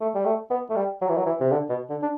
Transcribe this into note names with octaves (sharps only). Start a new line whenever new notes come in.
A3
G3
A3
B3
A3
G3
F#3
E3
F#3
E3
C3
D3
B2
D3
D4